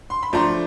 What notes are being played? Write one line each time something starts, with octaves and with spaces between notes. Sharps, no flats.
C6
B5
F3 A3 D4 A#5 C6